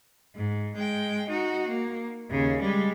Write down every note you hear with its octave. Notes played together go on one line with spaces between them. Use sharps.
G#2
G#3 G5
D#4 F#4
A#3
D#2 C#3
G3 G#3